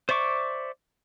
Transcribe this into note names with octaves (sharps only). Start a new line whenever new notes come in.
C5 D5 E5 C#6 D6